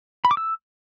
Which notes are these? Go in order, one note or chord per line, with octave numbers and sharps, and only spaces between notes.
B5
D6
E6